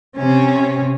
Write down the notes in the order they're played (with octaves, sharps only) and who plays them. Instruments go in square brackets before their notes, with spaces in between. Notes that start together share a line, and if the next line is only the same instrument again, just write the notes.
[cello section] C3 C4 C#4